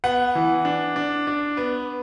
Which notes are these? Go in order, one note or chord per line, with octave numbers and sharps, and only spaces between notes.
B3 F#5
E3
D4
D4
D4
B3